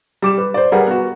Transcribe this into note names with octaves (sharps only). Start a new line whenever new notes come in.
G3 D6 E7
B4
C5 D5
G3 G#4 A#4 B4 F#5
B3 F#4